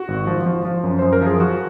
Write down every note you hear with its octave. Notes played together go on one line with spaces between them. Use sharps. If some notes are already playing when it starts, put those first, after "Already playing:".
Already playing: F#4
G#1
F3
F3
F3
F#2
F#2 C5
A#4
F3 G#4
F3 F#4